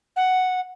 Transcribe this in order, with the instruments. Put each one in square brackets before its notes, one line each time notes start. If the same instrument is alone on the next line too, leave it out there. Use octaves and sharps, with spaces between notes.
[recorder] F#5